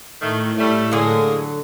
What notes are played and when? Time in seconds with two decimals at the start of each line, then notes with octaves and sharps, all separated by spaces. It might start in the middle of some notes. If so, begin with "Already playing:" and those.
0.22 A2 D#3 A3
0.58 G3 A3
0.91 D3 F#3 G#3 A#3 G#4